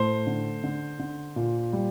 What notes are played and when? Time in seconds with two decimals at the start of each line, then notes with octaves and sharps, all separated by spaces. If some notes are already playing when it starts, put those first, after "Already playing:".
Already playing: A2 A3 C5
0.27 D3
0.64 D3
0.99 D3
1.36 A#2
1.73 G3